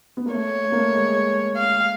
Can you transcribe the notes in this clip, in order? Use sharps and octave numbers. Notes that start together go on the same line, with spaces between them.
B3
A#3
A3 C#5
A3
A#3
A3
G#3
F5